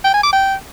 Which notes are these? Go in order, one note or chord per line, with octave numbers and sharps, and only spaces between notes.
G5
G#5
D6
G5